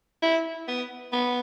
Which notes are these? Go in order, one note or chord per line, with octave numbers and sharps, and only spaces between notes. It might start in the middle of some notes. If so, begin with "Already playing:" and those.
E4
B3
B3